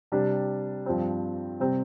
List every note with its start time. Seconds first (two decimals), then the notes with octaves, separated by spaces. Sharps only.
0.12 C3 G3 D4
0.86 G2 F3 C4
1.60 C3 G3 C4